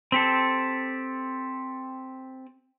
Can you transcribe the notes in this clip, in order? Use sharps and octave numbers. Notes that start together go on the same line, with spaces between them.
C4 G4 A4